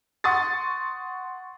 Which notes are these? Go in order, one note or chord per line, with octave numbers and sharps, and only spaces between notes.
F#5 C6 C#6 D#6 A6